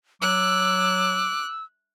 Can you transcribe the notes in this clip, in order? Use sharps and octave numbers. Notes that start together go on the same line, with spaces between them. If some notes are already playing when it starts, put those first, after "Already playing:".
F#3 D6 E6 F#6